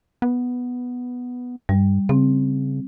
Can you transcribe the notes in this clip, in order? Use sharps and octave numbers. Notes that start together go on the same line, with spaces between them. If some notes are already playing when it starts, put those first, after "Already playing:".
B3
G2 G3
C#3 C4